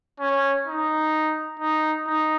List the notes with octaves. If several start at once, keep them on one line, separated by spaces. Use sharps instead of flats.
C#4
D#4
D#4
D#4